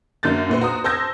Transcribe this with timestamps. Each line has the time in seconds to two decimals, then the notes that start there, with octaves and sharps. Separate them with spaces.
0.23 F#2 A#3 D4 G6 A6
0.49 A#2 B4 C5
0.61 F#4 A#5 D#6
0.84 C5 A5 E6 G6 G#6 A#6